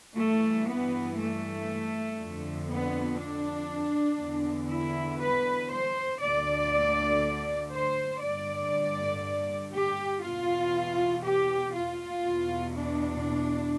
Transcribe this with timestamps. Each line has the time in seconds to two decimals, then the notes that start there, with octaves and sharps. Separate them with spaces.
0.17 G2 E3 A3
0.68 B3
1.19 A3
2.19 F2 D3
2.70 B3
3.20 D4
4.20 E2 D3
4.71 E4
5.21 B4
5.71 C5
6.21 D2 D3 D5
7.73 C5
8.23 G2 D3 D5
9.74 G4
10.24 E2 B2 F4
11.25 G4
11.75 F4
12.26 E2 B2
12.77 D4